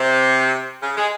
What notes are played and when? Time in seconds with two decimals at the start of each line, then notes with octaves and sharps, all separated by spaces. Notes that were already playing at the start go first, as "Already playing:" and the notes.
Already playing: C3
0.81 C#3
0.96 G#3